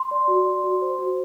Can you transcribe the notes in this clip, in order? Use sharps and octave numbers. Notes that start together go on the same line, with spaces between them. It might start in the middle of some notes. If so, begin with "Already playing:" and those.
Already playing: C6
D5
F#4
D5
F#4
C5
F#4